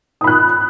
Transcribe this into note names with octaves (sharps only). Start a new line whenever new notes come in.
B5 D#6 F#6